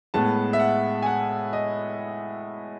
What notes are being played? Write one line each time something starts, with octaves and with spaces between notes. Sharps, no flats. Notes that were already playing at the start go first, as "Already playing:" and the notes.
A2 G#3 B3 A5
E5
F#5
G#5
F#5
D#5